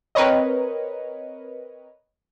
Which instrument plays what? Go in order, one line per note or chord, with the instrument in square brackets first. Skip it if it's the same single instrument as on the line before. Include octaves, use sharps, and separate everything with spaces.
[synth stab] C4 A#4 B4 C#5 D#5